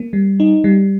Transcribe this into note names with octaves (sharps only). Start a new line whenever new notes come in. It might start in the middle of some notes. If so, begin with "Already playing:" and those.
Already playing: A#3
G3
D#4
G3